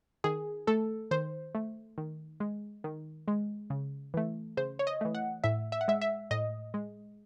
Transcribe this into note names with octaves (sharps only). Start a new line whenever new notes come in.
D#3 G#4
A3 A4
D#3 C5
A3
D#3
G#3
D#3
G#3
C#3
E3 A3
C#3 C5
C#5
D#5
E3 A3
F#5
A2 E5
E5
F#5
G#3 E5
E5
A2 D#5
G#3